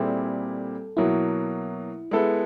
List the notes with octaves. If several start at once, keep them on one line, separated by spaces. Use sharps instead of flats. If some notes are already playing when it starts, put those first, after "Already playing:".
Already playing: A#2 G3 C4 E4 G#4 A4
B2 F#3 A#3 E4
G#3 B3 E4 A4